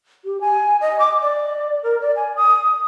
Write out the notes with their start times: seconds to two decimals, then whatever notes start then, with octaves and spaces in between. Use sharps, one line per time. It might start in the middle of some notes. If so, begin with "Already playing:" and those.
0.25 G4
0.41 G#5
0.81 D#5
0.99 D6
1.22 D5
1.83 A#4
2.01 D5
2.16 G#5
2.36 D#6